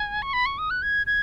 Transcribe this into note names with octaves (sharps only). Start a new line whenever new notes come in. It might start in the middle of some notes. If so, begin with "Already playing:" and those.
Already playing: G#5
C#6
B5
C#6
D#6
F#6
G#6
G#6